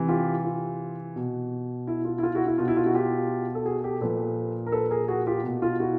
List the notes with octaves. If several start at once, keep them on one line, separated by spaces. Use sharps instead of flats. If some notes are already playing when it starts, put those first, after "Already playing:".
Already playing: C3 E3
F4 G4
F4
B2
E4
F4
E4
F4
E4 F#4
E4
B2 F4
E4
F4
E4 F#4
F4 G4
A4
F#4 G#4
G4 A4
A#2 F3 A4 B4
A#4
A4 B4
G#4 A#4
F#4 G#4
F4 G4
B2
F4
E4 F#4